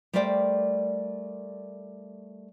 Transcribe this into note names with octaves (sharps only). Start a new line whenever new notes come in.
G3 A3 A#4 C5 D5 G5